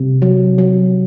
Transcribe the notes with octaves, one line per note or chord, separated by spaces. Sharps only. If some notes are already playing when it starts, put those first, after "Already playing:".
Already playing: C3
F#3
F#3